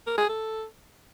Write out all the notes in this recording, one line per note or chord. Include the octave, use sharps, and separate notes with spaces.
A#4
G#4
A4